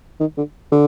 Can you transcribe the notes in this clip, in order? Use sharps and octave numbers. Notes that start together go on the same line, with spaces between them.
D#3
D3
D3